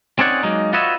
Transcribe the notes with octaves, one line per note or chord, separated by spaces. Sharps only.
C4 C#4 D#4 G#4 D5 F#5
F#3 G#3 A#3 D#4
F4 F#4 B4 C#5 D#5 E5